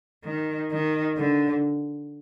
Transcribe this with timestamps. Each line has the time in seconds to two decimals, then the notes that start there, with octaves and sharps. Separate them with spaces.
0.24 D#3
0.71 D#3
1.17 D3